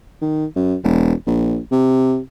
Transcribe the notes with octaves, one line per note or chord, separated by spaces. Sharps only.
D#3
F#2
E1
A#1
C3